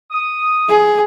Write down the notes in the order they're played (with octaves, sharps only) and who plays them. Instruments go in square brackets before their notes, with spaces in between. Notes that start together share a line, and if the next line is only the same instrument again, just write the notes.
[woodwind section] D#6
[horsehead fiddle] G#4